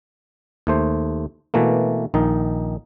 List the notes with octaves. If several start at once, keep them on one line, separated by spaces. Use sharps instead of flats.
D#2 A3 C5
B2 E3 A3 A#3
A#1 D#3 D#4